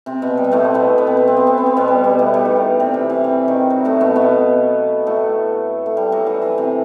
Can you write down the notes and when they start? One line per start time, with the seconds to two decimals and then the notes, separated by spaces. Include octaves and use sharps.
0.06 C3 C4
0.22 B2 B3
0.37 G3
0.44 B3
0.52 A2 A3
0.64 C4
0.74 B2 B3
0.98 B3
1.07 C4
1.17 B3
1.27 C4
1.37 B3
1.47 C4
1.58 B3
1.66 C4
1.77 B2 B3
1.88 G3
2.04 G3
2.19 A2 A3
2.34 G3
2.45 D#3
2.56 E3
2.80 C3
2.94 E3
3.10 E3
3.24 C3
3.48 D#3
3.70 F#3
3.85 A2 A3
4.01 B2 B3
4.16 B2 B3
5.07 A2 A3
5.86 A3
5.97 G3
6.12 F#3
6.27 E3
6.42 E3
6.58 C3